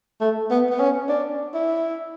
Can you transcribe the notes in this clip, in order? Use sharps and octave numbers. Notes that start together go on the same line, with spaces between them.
A3
B3
B3
C#4
D4
E4